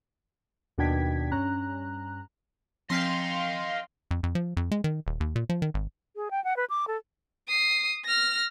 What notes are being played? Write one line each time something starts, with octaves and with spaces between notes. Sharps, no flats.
D#2 B2 D4 G5 G#6 B6
G2 C#4 A#5 F#6
F3 C4 D#5 F5 G5 C6 B6
F2
F2
F3
F2
G#3
D#3
D#1
D#2
A#2
F3
D#3
G#1
G#4
G5
F#5
B4
D6
A4
D#6 C7
F6 A#6